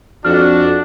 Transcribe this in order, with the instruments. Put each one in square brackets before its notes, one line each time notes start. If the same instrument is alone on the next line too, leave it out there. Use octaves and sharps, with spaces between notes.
[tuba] F2 [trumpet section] D4 [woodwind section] F#4 [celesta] F6